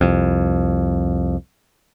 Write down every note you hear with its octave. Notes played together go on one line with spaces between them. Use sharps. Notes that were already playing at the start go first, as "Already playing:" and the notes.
C2 F2